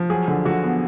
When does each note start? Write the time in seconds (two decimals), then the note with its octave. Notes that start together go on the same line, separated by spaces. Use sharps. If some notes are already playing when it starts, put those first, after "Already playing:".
Already playing: F3
0.10 F#3 G#4
0.28 D3
0.45 D3 F#4
0.64 B3